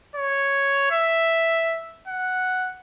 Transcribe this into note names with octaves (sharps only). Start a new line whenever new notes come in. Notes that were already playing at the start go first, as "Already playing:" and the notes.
C#5
E5
F#5